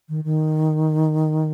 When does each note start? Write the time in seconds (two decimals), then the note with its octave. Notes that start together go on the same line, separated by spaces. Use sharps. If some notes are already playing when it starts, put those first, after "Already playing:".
0.09 D#3
0.24 D#3